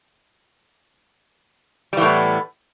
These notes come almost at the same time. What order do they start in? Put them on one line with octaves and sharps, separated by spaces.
G3 E3 A2 B3